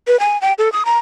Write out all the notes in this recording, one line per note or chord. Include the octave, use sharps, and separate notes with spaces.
B4
G#5
G5
A4
D#6
A#5